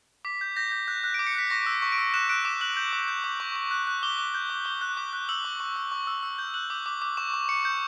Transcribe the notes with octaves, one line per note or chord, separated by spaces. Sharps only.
D6 B6
G6
G6 A#6
G6
F#6 G6
F#6
D6 D7
C#7
F#6 B6
C#6 A#6
E6
B6
C#6
D7
E6
F#6 E7
F#6 D7
D6 E7
F#6 F#7
G6
D6
G6
D6
C#6
C#6
F#6
F#6
D6 G7
D6
G6
D6
D6 G7
F#6
D6
F#6
E6 F#7
C#6
C#6
E6
C#6
E6
E6
G6
F#6 F#7
D6
D6
D6
C#6 E7
C#6
C#6 C#7
G6